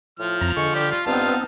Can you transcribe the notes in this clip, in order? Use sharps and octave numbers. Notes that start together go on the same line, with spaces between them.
A2 F3 F6
F2 A#5
D3 G#3 C#6
G3 G4
F4
G2 B3 C4 D#4 F4 A5 F6